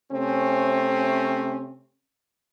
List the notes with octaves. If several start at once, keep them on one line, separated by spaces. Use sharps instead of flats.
C3 A3 C4 C#4